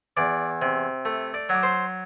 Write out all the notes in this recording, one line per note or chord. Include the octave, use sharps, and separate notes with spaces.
E2 D5 D6
C3
A3
D5 D6
F#3
D6
C5 C6